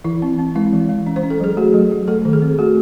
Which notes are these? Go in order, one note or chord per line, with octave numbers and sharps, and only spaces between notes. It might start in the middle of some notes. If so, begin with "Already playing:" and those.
E3 E4
C4
C4
G#3 E4
E3
G#3
C#4
C5
C#4
A4
F#3 G#4
A3 F#4
F#3
F#3
A3 A4
D#3
G#4
C4
A3 F#4